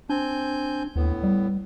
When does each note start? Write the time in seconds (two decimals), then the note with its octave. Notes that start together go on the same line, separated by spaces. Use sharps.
0.10 C4 D4 G#5 G6
0.96 D#2 A2 B3
1.23 G3